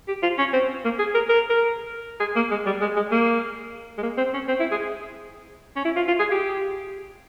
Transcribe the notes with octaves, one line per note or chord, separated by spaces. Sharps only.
G4
F4
C#4
C4
A#3
G#4
A#4
A#4
A#4
G#4
A#3
G#3
G3
G#3
G#3
A#3
G#3
A#3
C4
C#4
C4
E4
G#4
C#4
E4
F4
F4
G#4
G4